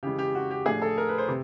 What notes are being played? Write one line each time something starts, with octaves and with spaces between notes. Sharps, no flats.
C#3 E3 G#3 G4
G4
F#4
G4
A2 F3 A3 D4 G#4
A4
A#4
B4
C5
C3